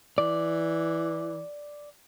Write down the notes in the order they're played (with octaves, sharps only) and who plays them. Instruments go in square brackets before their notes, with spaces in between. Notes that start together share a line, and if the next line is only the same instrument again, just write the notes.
[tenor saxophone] E3 [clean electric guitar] D5